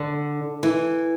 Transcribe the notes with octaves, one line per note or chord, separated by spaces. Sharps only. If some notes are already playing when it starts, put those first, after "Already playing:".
Already playing: D3
E3